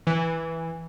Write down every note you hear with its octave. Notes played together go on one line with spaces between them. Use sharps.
E3